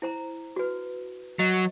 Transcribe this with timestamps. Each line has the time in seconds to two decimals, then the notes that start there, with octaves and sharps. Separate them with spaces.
0.02 E4 C5 A#5
0.56 F#4 B4
1.39 F#3 D#5